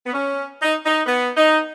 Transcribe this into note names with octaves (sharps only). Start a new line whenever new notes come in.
B3
C#4
D#4
D#4
B3
D#4